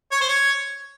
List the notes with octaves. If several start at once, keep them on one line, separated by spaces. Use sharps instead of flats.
C#5
C5
C#5